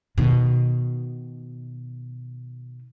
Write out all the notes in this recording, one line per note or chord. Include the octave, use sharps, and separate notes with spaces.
B2 D#3